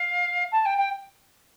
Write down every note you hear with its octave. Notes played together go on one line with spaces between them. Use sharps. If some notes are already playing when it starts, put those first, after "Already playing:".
Already playing: F5
A5
G5
G5